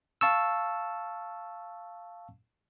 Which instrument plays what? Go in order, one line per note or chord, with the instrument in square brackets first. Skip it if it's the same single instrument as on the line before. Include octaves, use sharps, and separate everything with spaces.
[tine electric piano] F5 A5 C#6 E6